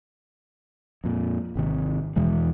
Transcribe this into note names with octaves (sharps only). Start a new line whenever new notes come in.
F2 A#2
G#1 C3 D#3
E2 B2 E3 G#3